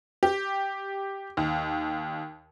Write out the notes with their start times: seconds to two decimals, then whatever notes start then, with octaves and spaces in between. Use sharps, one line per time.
0.23 G4
1.37 D#2